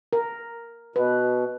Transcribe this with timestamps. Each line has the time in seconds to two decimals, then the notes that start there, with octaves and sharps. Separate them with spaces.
0.13 A#4
0.96 B2 B4